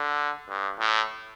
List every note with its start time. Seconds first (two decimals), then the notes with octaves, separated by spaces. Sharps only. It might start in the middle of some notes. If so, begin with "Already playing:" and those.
Already playing: D3
0.49 G2
0.79 A2